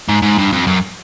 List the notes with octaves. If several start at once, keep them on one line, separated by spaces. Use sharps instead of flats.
G#2
G#2
G2
F2
F#2